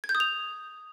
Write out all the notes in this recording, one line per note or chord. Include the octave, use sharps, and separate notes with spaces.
G#6
G6
D#6
F7